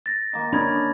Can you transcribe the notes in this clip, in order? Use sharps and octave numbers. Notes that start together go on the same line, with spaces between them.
A6 A#6
D#3 A#3
C#4 D4 A#4 D#5 B5 G#6